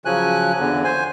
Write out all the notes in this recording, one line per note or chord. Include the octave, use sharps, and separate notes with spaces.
C#3 F3 F#3 G#5 F#6
E2 D3
C5 G#5